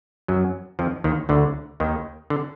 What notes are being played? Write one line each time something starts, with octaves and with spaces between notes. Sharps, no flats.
F#2 F#3
F2 F3
D#2 D#3
D2 D3
D#2 D#3
D3